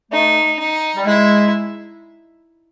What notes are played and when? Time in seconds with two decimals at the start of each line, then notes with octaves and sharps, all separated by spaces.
0.11 A3 D#4
0.59 D#4
0.96 G3
1.06 G#3 E4